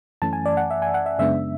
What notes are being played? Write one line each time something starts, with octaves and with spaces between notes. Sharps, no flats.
F#2 E3 A3 C#4 A5
G#5
D5
F#5
E5
G#5
F#5
E5
F#2 C#3 G#3 B3 D4 E5